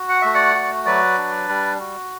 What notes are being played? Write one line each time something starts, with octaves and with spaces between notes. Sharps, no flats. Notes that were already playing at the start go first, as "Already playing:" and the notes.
Already playing: F#4
F#5
A3 E5
D5 F#5
F#4
F#3 B4 D5
D4
G3
F#4